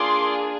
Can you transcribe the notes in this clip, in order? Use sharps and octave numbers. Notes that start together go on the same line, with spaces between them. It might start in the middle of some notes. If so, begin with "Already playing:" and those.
Already playing: A#3 D4 F4 G#4 C6 D6